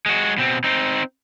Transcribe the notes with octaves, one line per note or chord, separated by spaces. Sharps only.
G#3 F#4
B2 C4
C4 D#4